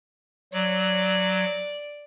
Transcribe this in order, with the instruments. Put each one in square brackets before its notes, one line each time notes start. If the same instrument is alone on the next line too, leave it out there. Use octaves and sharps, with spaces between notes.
[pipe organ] F#3 [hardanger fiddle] D5